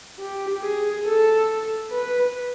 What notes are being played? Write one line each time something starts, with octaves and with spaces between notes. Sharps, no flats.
G4
G#4
A4
B4